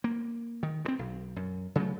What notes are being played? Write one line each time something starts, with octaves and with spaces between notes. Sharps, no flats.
A#3
D#3
G2 C4
B1
F#2
C#3 F#3 A3